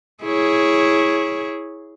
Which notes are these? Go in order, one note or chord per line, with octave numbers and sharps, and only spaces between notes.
E4 G#4 C#5